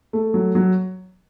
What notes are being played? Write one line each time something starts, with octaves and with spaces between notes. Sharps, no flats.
A3
F#3
F#3